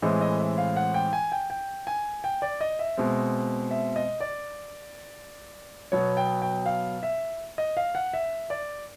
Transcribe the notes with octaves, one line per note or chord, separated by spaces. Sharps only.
A2 E3 G#3 C4 D#5
D#5
E5
F5
F#5
G5
G#5
G5
G5
G#5
G5
D5
D#5
E5
B2 G#3 C4
E5
D#5
D5
B2 F#3 B3 C#5
G5
G5
F5
E5
D#5
F5
F#5
E5
D5